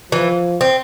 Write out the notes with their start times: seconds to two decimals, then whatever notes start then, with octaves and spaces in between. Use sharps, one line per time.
0.12 E3 F3
0.61 C4